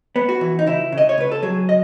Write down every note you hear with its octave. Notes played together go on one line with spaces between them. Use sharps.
B3
F#4
E3
D#4
C#2 E4
C#3
D#5
C#5
C#2 B4
A4
F#3 G#4
D#5